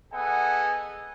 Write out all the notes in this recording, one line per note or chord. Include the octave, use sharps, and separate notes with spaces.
B3 G#4 A4 D#5 F#5 G#5